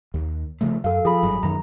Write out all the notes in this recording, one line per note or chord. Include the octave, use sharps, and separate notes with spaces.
D#2
C#3 F3 A3
F#2 A4 F5
F3 G#4 B5
G#1 G2 F#3
F#2 D#3 F#3 A#5